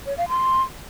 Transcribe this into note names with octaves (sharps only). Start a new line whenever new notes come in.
C#5
F5
C6